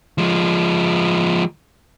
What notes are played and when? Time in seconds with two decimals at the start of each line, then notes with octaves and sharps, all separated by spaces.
0.18 F3 G#3